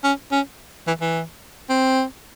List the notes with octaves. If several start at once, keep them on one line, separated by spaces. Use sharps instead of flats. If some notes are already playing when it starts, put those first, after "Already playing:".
C#4
C#4
E3
E3
C4